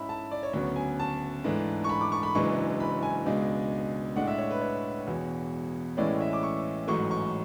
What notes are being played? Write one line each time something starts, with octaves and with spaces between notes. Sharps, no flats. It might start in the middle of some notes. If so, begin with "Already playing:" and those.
Already playing: G#2 G#3 C#4 E4 B5
A5
D5
C#5
D2 C#3 F#3 B3 C#5
G#5
A5
G#2 E3 A3 D4
C#6
B5
D6
C#6
B5
F#1 F#2 E3 G#3 D4 C#6
B5
G#5
C#2 B2 G#3 D4
A2 G#3 D4 F#5
E5
C#5
B4
C#5
E1 E2 B2
A1 A2 E3 G#3 C#4 D5
E5
D6
C#6
A1 G#2 F#3 A3 C#6
C#6